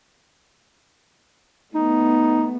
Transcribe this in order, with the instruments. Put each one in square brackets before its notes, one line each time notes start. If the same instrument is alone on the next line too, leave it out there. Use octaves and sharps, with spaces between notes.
[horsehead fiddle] A3 B3 [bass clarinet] D#4